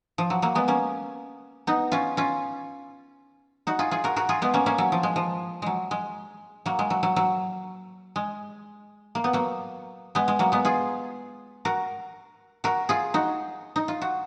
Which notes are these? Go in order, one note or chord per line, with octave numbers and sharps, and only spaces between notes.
F3
F#3
F#3 A#3
G#3 B3
A#3 C#4
B3 D#4
C#4 F4
C#4 F4
D#4 F#4
F4 G#4
F4 G#4
F#4 A#4
F#4 A#4
F4 G#4
G#3 B3
A#3 C#4
A#3 C#4
F#3
F3
G#3
F3
F#3 G#3
G#3
F#3 A#3
G#3
F#3
F#3
F#3
G#3
A#3
B3
F#3 A#3
G#3 B3
G#3
F#3 A#3
G#3 B3
F4 G#4
F#4 A#4
F#4 A#4
F4 G#4
D#4 F#4
D#4
F4
F#4